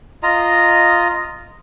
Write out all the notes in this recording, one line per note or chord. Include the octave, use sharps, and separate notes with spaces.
F4 D#5 A#5